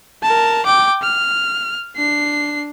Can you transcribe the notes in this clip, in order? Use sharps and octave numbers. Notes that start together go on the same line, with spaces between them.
A#4 A5
G5 D6
F6
D4 C7